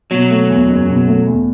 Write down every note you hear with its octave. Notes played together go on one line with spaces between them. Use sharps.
B2 F#3
A3
E2
F#1
B2
A3
E2